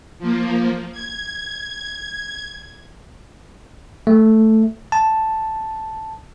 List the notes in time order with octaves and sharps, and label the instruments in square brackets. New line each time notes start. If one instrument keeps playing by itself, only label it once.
[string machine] F3 A#3
G#6
[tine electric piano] A3
A5